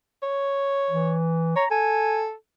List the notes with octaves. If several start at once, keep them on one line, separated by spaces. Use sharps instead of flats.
C#5
E3
C#5 A#5
A4 G#5